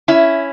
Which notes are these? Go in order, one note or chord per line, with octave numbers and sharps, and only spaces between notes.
C#4 E4